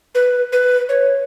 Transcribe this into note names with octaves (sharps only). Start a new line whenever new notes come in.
B4
B4
C#5